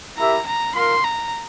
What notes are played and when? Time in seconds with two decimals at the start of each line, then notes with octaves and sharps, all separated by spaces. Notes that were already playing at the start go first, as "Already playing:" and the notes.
0.17 E4 G4 A#4 E5 A#5
0.47 A#5
0.75 F4 A#4 F5 C6
1.04 A#5